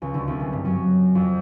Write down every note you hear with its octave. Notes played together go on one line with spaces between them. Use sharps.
C#2 C#3
D2 D3
C2 C3
C#2 C#3
G2 G3
F#2 F#3
F2 F3